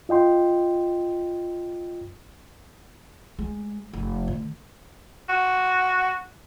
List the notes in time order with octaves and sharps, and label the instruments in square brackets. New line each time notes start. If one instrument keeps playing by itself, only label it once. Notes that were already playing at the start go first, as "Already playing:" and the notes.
[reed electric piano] F4 D#5 G5 C6
[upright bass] G#3
F1
D3
[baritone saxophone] F#4